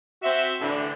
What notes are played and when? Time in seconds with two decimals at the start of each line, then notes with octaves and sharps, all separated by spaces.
0.23 C4 F#4 C5 E5
0.61 A2 D3 E3 D4